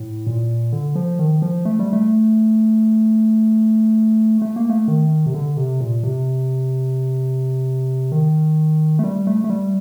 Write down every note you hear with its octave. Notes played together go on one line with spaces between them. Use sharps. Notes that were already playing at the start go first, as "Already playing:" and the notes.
Already playing: A2
A#2
D3
F3
D#3
F3
A3
G3
A3
A3
A#3
A3
D#3
C3
D3
C3
A#2
C3
D#3
A3
G3
A3
A3
G3